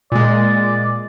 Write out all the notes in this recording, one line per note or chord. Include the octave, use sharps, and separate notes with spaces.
A#2 G#3 D5